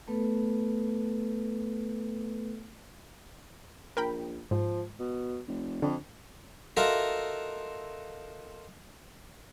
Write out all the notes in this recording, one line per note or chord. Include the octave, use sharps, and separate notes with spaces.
A3 B3 A4 B4
A#1 A#4 G5 B5
G#2 F3
B2
F1
F2 D3
D#4 F4 F#4 A4 A#4 E5